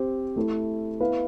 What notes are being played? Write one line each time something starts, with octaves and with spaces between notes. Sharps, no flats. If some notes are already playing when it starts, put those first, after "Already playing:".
Already playing: C4 G4 C5
A3 E4 A4
B3 E4 B4 F5